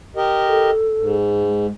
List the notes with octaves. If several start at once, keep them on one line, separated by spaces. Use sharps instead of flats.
G4 A#4 D#5
A4
G#2
G#3